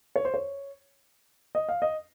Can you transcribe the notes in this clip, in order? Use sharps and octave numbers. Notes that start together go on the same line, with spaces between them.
C#5
C5
C#5
D#5
F5
D#5